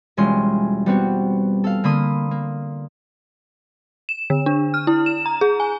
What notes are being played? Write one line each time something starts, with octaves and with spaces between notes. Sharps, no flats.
E1 G3 G#3 C#4 F4 C6
G3 B3 C4 F#4
A4 F5
D3 A#3 B5 C6 D#6 C7
A#3
E7
D3
D4
F6
E4
E7
A#5
G#4
G#5